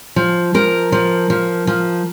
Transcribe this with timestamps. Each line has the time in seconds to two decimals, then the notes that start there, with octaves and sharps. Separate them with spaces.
0.16 F3
0.54 F3 A#4
0.92 F3
1.30 F3
1.67 F3